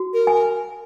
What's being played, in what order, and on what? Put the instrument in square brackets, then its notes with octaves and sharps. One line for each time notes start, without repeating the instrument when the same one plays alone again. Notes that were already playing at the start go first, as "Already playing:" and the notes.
Already playing: [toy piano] F#4
[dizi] A#4
[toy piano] G#5